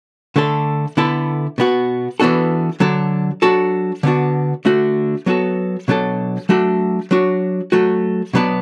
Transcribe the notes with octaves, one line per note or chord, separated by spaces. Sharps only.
D3 A3 D4 A4
D3 B3 E4 A4
B2 B3 F#4
E3 B3 D4 F#4 A4
D3 F#3 D4 A4
F#3 D4 F#4 A4
D3 B3 D4 F#4
D3 A3 F#4
F#3 B3 F#4 A4
B2 F#3 D4 A4
F#3 A3 D4 F#4 A4
F#3 D4 F#4
F#3 A3 F#4
B2 F#3 B3 D4